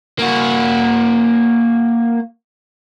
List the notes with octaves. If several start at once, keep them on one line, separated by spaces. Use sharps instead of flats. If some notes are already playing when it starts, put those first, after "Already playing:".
A#3 F#4